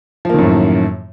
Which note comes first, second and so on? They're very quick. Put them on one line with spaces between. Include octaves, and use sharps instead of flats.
F3 A#3 D#3 F#2 A2